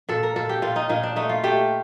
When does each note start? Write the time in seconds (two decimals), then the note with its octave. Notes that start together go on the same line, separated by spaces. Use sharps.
0.09 A#2 A4
0.23 A#4
0.36 A#2 A4
0.49 G4
0.62 A#2 F4
0.76 D#4
0.89 A#2 D#4
1.03 D4
1.16 A3 D#4
1.29 F4
1.43 A3 G4